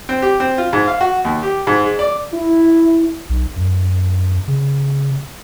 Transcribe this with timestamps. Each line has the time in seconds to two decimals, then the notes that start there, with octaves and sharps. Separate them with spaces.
0.09 C4
0.22 G4
0.40 C4
0.58 F4
0.73 G#2
0.88 F5
1.01 F#4
1.25 D#2
1.43 G4
1.67 G#2
1.84 G#3
1.99 D5
2.33 E4
3.29 B1
3.56 F#2
4.47 C#3